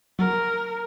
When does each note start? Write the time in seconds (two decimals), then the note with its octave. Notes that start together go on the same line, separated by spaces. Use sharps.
0.19 F#3 A#4